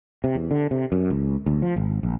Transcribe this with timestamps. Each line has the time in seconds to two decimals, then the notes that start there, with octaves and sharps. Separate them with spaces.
0.24 C3
0.35 E2
0.51 D3
0.71 C3
0.92 F#2
1.10 C#2
1.46 D2
1.62 F3
1.76 G#1
2.03 A#1